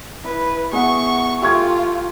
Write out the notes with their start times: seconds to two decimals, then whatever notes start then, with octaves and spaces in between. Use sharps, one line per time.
0.24 E4 B4
0.73 B3 G#4 E5 F#5 C#6
1.42 A3 F4 G4 E5 C#6 G#6